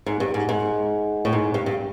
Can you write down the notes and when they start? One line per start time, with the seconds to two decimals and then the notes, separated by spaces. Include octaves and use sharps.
0.06 G#2
0.20 G2
0.34 G#2
0.49 G#2
1.25 A2
1.33 G#2
1.54 G2
1.66 G2